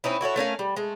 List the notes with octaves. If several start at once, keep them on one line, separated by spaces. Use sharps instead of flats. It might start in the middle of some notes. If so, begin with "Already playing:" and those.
C4 C#4 D#4 E4
E4 F#4 A4 C#5
A3 C#4 A#4 F5
G3
G#3 A3